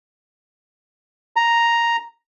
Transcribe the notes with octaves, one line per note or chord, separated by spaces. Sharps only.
A#5